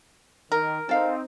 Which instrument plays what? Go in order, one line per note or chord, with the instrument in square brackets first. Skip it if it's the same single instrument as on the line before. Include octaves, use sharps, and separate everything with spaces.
[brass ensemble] D#3 [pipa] A#4
[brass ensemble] C4 D#4 [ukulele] A4 F5